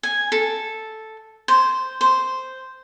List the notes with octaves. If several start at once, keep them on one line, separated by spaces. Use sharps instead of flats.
G#5
A4
C5
C5